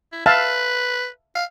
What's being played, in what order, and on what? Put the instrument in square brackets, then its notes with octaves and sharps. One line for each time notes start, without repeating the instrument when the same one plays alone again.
[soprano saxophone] E4
[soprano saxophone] B4 [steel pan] E5 F5 A5
[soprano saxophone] F5